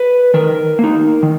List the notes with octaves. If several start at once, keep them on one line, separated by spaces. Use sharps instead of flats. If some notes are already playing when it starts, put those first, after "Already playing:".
Already playing: B4
D#3 A#4
A#3 D#4
D#3